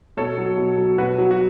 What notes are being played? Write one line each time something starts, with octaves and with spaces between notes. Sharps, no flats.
B2 A4 C#5
F#3
B2
F#3
B2 F#4 B4
F#3
F#4